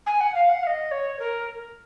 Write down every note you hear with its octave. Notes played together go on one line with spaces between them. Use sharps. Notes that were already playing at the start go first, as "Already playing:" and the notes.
G#5
F#5
F5
F#5
F5
D#5
C#5
A#4